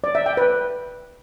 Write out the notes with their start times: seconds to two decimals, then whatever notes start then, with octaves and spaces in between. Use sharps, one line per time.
0.04 D5
0.15 E5
0.26 G5
0.37 B4